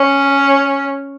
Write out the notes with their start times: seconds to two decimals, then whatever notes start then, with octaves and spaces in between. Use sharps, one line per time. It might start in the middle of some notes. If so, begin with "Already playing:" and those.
Already playing: C#4